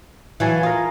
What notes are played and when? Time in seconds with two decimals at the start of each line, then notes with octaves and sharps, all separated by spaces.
0.40 E3 F#3 F5 G#5 A5
0.63 F4 G#4 A#4